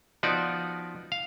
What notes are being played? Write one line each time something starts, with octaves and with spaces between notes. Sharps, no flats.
F3 B3 D#4 F#4 D5
F5